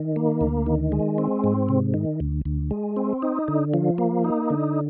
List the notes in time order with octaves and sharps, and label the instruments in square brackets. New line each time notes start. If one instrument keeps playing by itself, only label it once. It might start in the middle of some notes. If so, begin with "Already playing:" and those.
Already playing: [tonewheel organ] D#3
A#3
D2
D#3
G#3
C4
G#2
C3
D#3
D2
D2
G#3
C4
D#4
D3
F3
A#3
D#4
D3